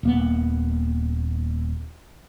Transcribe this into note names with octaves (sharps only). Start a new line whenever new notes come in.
D#1 A#3 B3